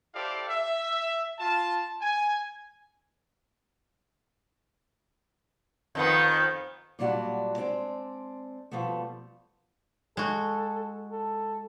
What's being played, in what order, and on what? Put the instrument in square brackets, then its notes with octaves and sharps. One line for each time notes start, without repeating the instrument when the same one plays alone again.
[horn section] E4 G4 A4 C5 D5 F5
E5
F4 A5
G#5
[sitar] F2 D#3 B3
[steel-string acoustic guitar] A#2 F#3 G3 D4 F#4
G#3 C4 D4
B2 F3 G3 A3
[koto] G#3 F#4 [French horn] A4
[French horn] A4